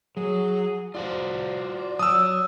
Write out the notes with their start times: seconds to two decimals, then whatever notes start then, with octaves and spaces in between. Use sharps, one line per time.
0.17 F#3 G#4
0.95 F4 F#4 C5 D5
1.99 F#3 D#6 E6